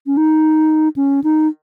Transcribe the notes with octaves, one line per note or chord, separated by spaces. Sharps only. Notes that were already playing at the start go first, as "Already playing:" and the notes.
C#4
D#4
C#4
D#4